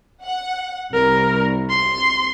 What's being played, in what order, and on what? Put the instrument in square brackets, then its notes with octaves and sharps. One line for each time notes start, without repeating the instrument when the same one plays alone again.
[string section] F#5
[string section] C2 [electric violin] A#4
[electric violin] C6